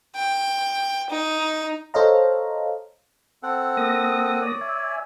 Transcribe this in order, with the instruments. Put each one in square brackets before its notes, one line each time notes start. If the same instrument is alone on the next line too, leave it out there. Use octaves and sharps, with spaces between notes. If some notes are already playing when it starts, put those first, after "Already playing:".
[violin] G5
D#4
[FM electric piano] A4 C5 C#5 D#5 F5 A#5
[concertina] C4 A4 F#5
[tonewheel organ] A#3 D#6 A#6
[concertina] C#5 D5
[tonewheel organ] E5 G#5